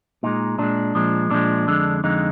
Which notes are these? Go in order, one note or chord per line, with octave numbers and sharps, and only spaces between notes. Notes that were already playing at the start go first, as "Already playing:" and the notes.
A#2 G#3 D#4
A#2 G#3 D4
A#2 F3 G#3
A#2 F3 G#3 D4
F2 D3 G#3
F2 D3 G#3 D#4